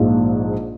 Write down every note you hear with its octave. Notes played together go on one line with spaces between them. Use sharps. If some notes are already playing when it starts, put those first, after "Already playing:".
Already playing: A#1 G#2 F3